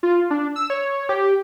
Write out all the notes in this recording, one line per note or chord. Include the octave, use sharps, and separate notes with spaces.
F4
D4
E6
C#5
G4